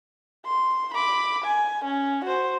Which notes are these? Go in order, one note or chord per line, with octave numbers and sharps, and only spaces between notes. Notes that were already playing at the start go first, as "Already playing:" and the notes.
C6
B5 D6
G#5
C#4
F#4 C5